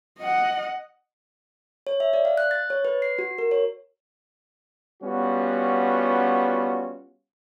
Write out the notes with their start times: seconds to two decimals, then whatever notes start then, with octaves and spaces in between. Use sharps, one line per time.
0.19 D#5 F#5
1.87 C#5
2.00 E5
2.13 D5
2.25 F5
2.38 F#6
2.51 A6
2.70 C#5
2.85 B4
3.02 C7
3.19 F#4
3.38 A#4
3.51 C#5
5.02 G3 B3 C#4 F4 F#4